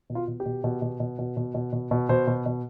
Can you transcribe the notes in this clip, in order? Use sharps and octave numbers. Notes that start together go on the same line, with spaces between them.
B2
F4
B2
G4
B2
B2
B2
B2
B2
B2
B2
B2
B2
B2 C5
B2
B2